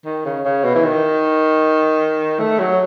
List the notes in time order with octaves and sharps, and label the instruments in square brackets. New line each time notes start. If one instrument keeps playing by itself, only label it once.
[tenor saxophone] D#3
C#3
C#3
B2
E3
D#3
A3
F#3